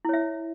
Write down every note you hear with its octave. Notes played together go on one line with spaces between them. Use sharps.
E4 C#5 E5